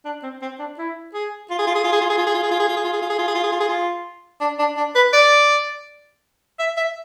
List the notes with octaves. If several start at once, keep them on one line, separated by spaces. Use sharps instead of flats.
D4
C4
C4
D4
E4
G#4
F4
G#4
F4
G#4
F4
G#4
F4
G#4
F4
G#4
F4
G#4
F4
G#4
F4
G#4
F4
G#4
F4
G#4
F4
G#4
F4
G#4
F4
G#4
F4
D4
D4
D4
B4
D5
E5
E5